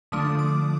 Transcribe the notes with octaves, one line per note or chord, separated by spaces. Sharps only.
D3 F3 A3 D4 D#6
D6